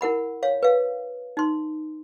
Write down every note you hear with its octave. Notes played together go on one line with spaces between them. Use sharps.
E4 A#4 F#5 B5
C#5 F5
B4 F5
D#4 C6